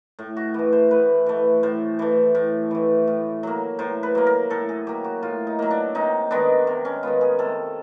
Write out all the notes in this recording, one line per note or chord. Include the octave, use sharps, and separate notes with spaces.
A2
F#4
E3 A3
C5
A2 B4
E3 A3
A2 C5
E3 A3
A2
E3 A3
A2
F#3 A#3
A2 C5
B4
F#3 A#3
A#4
A2 A4
G#4
F#3 A#3 G4
F#4
A2 F4
D#4
F#3 A#3
D4
C3 D#4
D#3 G#3 B3 D4
C3
C#4
D#3 G#3 B3 F4
G#4
C3 A4